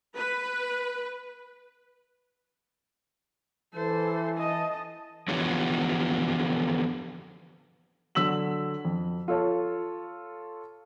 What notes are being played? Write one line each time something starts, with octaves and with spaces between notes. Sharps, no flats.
B4
E3 A4 C5
D#5 A5
D3 E3 F3 B3 G4 C#5
D3 F#3 E6 B6 F#7
F2
F4 A4 C#5